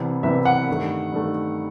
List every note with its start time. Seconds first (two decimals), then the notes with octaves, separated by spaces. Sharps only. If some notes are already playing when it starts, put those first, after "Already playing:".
Already playing: C2 C3 E3 B3
0.23 C2 C3 E3 B3 E5
0.45 F#5
0.68 G2 D#3 A3
1.12 G2 D#3 A3